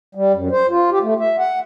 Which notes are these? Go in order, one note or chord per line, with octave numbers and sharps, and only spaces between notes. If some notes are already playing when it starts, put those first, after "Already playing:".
G3
F#2
C5
F4
G4
A3
E5
F#5